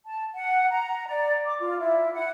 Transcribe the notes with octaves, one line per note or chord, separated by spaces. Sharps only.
A5
F#5
A#5
D5
D6
F4
E4
F#5